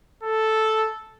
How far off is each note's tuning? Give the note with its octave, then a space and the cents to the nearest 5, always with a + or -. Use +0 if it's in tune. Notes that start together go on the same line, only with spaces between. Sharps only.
A4 -5